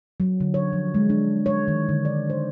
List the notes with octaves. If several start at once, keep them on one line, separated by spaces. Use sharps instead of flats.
F#3
D3
C#5
F3
G#3
D4
C#5
D#3
D3
D5
C5